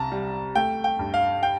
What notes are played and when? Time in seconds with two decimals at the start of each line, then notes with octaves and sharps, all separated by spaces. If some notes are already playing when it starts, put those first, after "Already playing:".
Already playing: C2 A5 A#5
0.12 G3
0.55 A3 G5
0.84 G5
0.99 G2
1.14 F5
1.43 G5